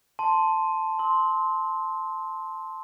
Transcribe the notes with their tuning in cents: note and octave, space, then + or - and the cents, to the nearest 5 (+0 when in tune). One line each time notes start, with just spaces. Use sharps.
A5 +0 C6 +0
C6 +0 E6 -40